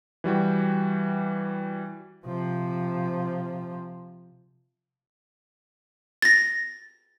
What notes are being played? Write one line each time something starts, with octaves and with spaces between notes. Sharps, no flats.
E3 G3 F#4 G5
C3 F3
A6 A#6